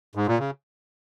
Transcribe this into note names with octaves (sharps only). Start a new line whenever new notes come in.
G#2
A#2
C#3